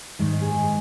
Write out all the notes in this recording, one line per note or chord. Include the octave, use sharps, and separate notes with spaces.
G#2 D#3 G#3
G#4